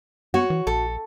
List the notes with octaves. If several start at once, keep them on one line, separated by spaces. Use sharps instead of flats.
B3 F#4 C#5
E3
A#1 A4